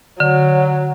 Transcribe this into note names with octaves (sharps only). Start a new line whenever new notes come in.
D3 F#3